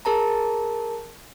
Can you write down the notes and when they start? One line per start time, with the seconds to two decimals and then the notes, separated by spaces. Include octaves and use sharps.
0.05 G#4 A#4 A5 A#5